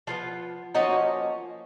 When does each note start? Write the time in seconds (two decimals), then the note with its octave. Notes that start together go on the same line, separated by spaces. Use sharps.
0.07 F3 G#3 B3 F4
0.74 F3 A#3 C#4 D#4 F#4